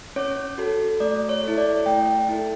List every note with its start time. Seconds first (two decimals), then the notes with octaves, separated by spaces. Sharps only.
0.16 C#4 C#5
0.58 F#4 A4
1.00 A3 D5
1.29 C#5
1.43 E4 A4
1.58 D5
1.86 A3 G5
2.29 E4 A4